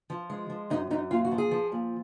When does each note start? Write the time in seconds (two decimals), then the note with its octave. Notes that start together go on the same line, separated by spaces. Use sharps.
0.10 F3
0.30 G#3
0.50 F3
0.70 F#2 D#4
0.91 F#2 D#4
1.11 A#2 F4
1.25 F#4
1.31 F3
1.38 G#4
1.51 F3
1.72 A#2